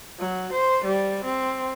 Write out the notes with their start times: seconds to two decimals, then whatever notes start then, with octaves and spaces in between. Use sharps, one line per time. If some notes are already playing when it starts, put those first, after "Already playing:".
0.20 F#3
0.53 C5
0.85 G3
1.25 C4